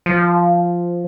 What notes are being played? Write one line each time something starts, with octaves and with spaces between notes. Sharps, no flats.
F3